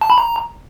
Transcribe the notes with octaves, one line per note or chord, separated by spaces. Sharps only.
A5
B5
A#5